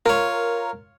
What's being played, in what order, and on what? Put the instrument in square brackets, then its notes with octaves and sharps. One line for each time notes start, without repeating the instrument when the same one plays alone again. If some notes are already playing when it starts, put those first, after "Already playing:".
[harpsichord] F4 C#5 [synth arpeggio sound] A#4